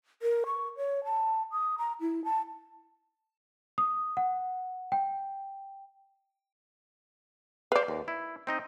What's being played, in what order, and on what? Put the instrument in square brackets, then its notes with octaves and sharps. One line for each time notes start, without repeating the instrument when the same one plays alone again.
[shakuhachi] A#4
C#6
C#5
A5
D#6
A#5
E4
A5
[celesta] D#6
F#5
G5
[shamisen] B4 D5 [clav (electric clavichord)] C5 F5
[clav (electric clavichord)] D#2
E4
C4 D#4 D#5